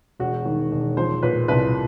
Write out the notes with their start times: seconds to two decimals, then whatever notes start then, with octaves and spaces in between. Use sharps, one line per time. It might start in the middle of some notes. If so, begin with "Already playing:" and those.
0.20 E1 F#4
0.46 D#3
0.72 E1
0.97 F3 C5
1.23 A#2 B4
1.48 C2 B4